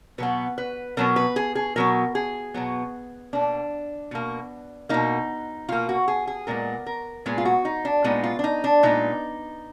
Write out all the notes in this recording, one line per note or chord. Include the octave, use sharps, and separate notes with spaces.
B2 F#3 B3 B4
B4
B2 F#3 B3 A#4
B4
G#4
G#4
B2 F#3 B3 A#4
G#4
B2 F#3 B3
B2 A#3 D4
B2 A#3
B2 A#3 D#4
B2 A#3 F4
F#4
G#4
G#4
A#2 G#3 B3 A#4
A#4
A#2 G#3 B3 G#4
F4
F#4
D#4
D4
A#2 G#3 B3 D#4
F4
D4
D#4
D4
A#2 G#3 B3 D#4